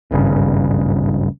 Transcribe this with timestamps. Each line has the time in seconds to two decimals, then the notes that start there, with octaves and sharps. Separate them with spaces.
0.11 D1 G#1 G2 C#3